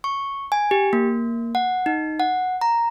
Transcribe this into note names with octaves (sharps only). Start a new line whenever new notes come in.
C#6
G#5
G4
A#3
F#5
D#4
F#5
A#5